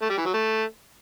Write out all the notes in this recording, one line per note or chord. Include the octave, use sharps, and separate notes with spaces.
A3
G3
E3
F#3
A3